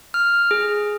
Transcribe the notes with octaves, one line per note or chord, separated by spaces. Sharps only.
F6
G#4